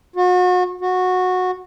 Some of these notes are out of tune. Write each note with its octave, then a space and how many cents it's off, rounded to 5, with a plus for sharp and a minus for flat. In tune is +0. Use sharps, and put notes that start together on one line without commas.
F#4 -35
F#4 -15